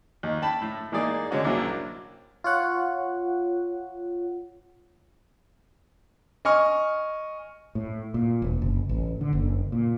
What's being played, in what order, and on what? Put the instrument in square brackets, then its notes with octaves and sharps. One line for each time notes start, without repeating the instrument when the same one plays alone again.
[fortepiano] D#2
G5 A5 B5
A2
E3 G#3 A#3 D#4 G#4 D5
D3 G#3 C#4 F#4
C2 F#3 A#3 D4 E4
[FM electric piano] F4 C#5 F#5
[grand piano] D#5 G#5 C#6 F6
[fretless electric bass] A2
A#2
E1
F#1
A1
D3
F#1
A#2